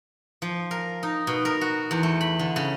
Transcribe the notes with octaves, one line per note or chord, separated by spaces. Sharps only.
F3
A#4
D#4
B2
A#4
F#4
E2
A3
B5
D3
C#3